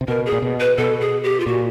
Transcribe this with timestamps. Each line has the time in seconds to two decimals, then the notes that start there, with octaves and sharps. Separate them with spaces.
0.01 C3
0.08 B2 A#4
0.26 G#4
0.32 A#2
0.42 B2
0.60 B4
0.78 B2 A4
1.01 G#4
1.24 G4
1.40 F4
1.46 A#2 F#4